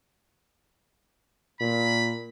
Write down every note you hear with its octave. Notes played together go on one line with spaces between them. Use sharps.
A#2 B5